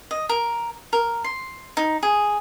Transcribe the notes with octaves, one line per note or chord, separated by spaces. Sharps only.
D#5
A#4
A#4
C6
D#4
G#4